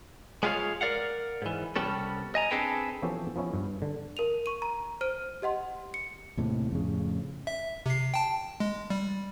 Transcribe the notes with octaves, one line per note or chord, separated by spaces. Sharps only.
G#3 B3 F4 G#4 C#5 F5
A#4 D5 F5 F#5
G#2 E3
C2 G3 B3 C#4 A4
D#5 G#5 A#5
C4 D4 G#4 A4 B4 G5
E3 F3 B3 C#4 G4 A4
F3 B3 C#4 E4
G2
D3
A#4 D#7 F7
C#6 D#7
A#5
C5 F6 D7 D#7
G4 D#5 F#5 C6
C#7
D#2 A2 C3
F2 A2 C#3
E5
C3 C7
G5 A5
G#3
G3